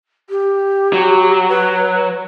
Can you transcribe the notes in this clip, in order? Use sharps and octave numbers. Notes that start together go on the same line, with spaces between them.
G4
F#3
B4